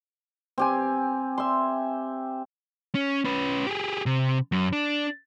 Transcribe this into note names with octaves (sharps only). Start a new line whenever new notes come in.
C4 G4 G#5
E5 C6
C#4
C#4 B4
G4 G#4
C3
F#2
D4